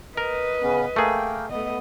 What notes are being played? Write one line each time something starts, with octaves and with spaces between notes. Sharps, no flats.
A#4 B4 D#5
C#3 B3 C#4
A3 A#3 G#4 A#4 G5
A3 B3 D#5